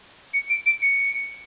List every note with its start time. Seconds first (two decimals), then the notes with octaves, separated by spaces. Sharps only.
0.34 C#7
0.50 D7
0.66 D7
0.82 C#7